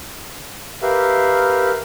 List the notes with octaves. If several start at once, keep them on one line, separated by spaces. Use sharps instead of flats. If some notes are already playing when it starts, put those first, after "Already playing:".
G4 A#4 B4 E5 F5